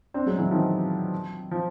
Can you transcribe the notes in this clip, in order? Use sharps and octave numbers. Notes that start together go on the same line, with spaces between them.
C4 D4
F#3 G#3
E3 F#3
D#3 F3
F3